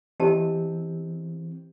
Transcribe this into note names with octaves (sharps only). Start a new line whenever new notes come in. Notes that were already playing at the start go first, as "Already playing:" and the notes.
E3 C4 G4 D#5 A5